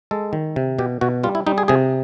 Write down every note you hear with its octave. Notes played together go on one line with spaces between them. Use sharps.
G#3 A4
D#3
C3
B2 G4
B2 F#4
G3 F4
E4
G3 D#4
G#4
C3 G#4